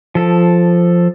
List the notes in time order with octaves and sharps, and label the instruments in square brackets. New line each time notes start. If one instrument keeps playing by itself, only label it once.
[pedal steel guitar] F3 A4